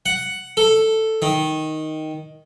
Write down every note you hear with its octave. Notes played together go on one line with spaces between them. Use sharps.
F#5
A4
D#3